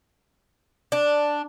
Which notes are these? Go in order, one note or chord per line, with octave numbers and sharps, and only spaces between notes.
D4